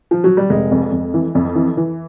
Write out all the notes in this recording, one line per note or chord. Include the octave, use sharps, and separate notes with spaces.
F3
F#3
G3
F1 G#3
F2
F2
E3
F2
E3
E3